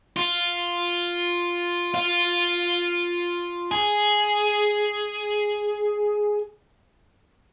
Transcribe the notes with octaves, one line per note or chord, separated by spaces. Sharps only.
F4
F4
G#4